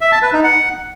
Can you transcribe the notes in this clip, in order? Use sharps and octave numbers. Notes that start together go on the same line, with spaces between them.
E5
A5
B4
D#4
F#5